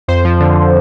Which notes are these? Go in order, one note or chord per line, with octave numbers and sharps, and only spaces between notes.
F2 C5
F3
D3